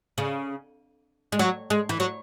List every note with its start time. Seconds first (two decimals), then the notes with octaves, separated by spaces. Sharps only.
0.18 C#3
1.32 G#3
1.39 F#3
1.70 G#3
1.89 E3
2.00 F#3